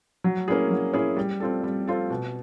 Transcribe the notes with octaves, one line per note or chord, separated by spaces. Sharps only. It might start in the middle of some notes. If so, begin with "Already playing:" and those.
F#3
A#3 C#4 E4 G#4
F#3
A#3 C#4 E4 G#4
G3
C4 F4 A4
G3
C4 F4 A4
B2